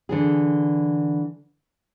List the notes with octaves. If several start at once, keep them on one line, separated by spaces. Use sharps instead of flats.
D3 E3 G#4